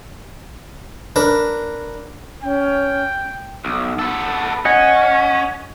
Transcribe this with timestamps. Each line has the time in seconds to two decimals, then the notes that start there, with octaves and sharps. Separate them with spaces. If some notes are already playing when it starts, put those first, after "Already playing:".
1.16 D4 A#4 B4
2.43 C#4 G5
3.65 B1
3.99 B3 A4
4.65 C#4 D#5 F#5 G#5